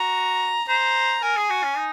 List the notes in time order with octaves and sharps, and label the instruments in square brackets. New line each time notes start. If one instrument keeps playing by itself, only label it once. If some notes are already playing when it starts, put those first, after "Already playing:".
Already playing: [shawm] F#4 [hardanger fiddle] A#5
[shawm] C5 [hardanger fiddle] A#5
[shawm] A#4 [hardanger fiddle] G#5
[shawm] G#4
F#4
C#4
D#4